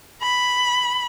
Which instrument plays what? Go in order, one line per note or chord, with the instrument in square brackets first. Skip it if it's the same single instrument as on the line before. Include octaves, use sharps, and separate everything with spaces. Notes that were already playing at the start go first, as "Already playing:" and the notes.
[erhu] B5